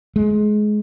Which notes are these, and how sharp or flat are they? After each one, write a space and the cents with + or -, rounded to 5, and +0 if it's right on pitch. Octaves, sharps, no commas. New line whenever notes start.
G#3 +20